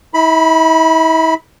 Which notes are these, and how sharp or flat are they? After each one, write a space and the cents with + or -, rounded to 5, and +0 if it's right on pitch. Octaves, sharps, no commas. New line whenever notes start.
E4 -40 B5 +0